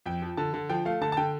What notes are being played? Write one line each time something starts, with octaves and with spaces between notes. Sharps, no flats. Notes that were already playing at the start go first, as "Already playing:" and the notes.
F2 G5
F3
D3 A5
D3
F3 G5
A3 F5
D3 A5
A5
D3 G5